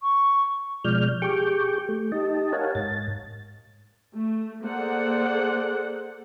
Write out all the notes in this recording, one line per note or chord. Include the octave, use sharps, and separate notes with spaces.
C#6
B2 F3 G#3 D5 F6 G6
G4 G#4 C#6 D6 G6
A3
D#4 G4 D#5 A5
A#4 C#5 F5 F#5 G#5 A5
G#2 A6
A3
A#3 G#4 A4 C5 D5 F#5